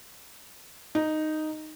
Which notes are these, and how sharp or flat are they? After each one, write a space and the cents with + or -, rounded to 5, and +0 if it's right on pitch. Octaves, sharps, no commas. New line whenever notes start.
D#4 -5